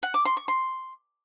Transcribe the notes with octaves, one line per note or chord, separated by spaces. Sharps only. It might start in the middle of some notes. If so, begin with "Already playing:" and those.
F#5
D6
C6
C#6
C6